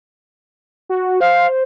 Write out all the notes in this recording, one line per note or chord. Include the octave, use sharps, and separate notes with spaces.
F#4
C5 F5